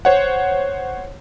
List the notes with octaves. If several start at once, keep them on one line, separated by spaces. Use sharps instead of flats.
C5 C#5 F#5